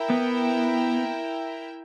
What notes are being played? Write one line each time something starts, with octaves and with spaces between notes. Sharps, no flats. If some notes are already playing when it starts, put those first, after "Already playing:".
Already playing: E4 A#4 E5 G5
B3